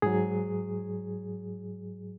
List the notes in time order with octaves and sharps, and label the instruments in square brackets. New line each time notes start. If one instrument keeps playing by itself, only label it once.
[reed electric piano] G#2 F#3 G#4